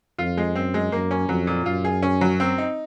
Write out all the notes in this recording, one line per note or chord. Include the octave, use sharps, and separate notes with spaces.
F2 F4
G#3
F#2 C4
G#3
F#2 A#3
C#4
F2 F#3
A#2
F#2 F4
G#4
C#4
F#3
C4
D#4